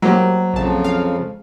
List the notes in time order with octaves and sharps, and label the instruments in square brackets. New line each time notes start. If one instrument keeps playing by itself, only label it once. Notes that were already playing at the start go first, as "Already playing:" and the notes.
[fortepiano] F#3 [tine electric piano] G#3 C5 [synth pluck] A#3 G4
[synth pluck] A#1 A5 [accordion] F2 C#3 F3
[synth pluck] F5